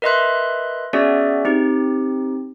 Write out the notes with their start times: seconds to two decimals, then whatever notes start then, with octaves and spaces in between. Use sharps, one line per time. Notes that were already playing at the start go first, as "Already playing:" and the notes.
0.02 A#4 B4 D#5 E5 C6 F#6
0.93 B3 C#4 F#4 G#4 D5 E5
1.45 C4 D#4 G4